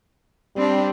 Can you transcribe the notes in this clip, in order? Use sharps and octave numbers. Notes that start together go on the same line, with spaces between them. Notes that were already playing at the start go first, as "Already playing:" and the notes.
G3 C4 D4